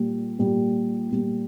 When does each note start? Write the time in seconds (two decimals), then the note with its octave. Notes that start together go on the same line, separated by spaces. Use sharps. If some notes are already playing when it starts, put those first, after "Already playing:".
Already playing: A#2 G3 A#3
0.39 A#2 G3 A#3
1.11 A#2 G3 A#3